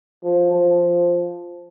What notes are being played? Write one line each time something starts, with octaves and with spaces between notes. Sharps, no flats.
F3
F3